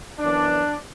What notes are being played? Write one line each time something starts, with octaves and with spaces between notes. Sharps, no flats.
F#2 E3 B3 D4